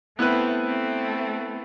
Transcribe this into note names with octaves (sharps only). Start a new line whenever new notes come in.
A3 B3 C4 E4 B4
A3 C4